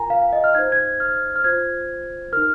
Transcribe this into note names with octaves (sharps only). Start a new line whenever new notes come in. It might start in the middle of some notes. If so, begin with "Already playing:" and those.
Already playing: F4 A#4 G#5 A#5
F5
F5
D#5
F6
D#4 C5 G#6
G#6
F6
F6
F4 C5 G#6
D#4 A#4 F6